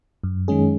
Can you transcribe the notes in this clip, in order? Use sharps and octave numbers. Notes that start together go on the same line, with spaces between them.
F#2
D#3 G#3 C#4 G#4